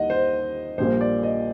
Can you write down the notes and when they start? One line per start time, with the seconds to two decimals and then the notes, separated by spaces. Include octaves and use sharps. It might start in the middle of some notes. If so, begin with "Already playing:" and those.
Already playing: D#2 D#3 G3 A#3 D#5 F#5
0.10 C5
0.78 A#1 A#2 G3 A#3 C5
1.01 D5
1.23 D#5